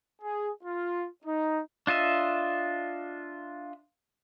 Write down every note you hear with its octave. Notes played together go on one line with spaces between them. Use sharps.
G#4
F4
D#4
D4 F4 D#5 E5